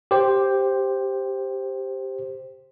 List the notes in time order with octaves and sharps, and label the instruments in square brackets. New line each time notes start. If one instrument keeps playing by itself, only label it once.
[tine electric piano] G4 C5